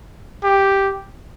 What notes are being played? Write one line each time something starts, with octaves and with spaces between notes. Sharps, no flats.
G4